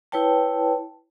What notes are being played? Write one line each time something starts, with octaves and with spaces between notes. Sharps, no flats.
E4 B4 C#5 G5 A5